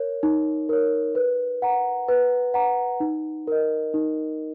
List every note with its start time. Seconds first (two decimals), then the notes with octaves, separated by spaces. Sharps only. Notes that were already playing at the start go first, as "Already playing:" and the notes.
Already playing: A#4 C#5
0.23 D#4
0.69 A#4 C#5
1.15 B4
1.62 F#5 A#5
2.08 B4
2.54 F#5 A#5
3.00 D#4
3.47 A#4 D#5
3.94 D#4